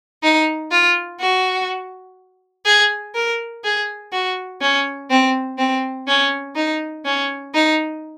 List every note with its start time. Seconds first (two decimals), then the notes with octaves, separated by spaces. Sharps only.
0.23 D#4
0.71 F4
1.20 F#4
2.66 G#4
3.14 A#4
3.64 G#4
4.13 F#4
4.61 C#4
5.10 C4
5.58 C4
6.07 C#4
6.56 D#4
7.05 C#4
7.54 D#4